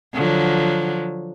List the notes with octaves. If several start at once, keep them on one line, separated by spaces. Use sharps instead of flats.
D3 F3 F#3